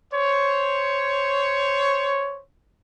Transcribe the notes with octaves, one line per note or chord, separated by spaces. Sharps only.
C5 C#5